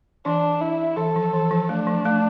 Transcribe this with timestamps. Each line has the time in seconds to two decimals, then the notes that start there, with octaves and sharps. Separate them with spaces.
0.25 E3 D4
0.61 E4
0.97 E3 A4
1.16 F3
1.34 E3
1.51 F3
1.69 A3 D4
1.87 F3
2.05 A3